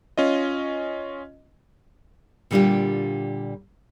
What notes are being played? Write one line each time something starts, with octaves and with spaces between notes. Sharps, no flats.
C#4 F4 D#5
A#2 D3 G3 D4 F4 G4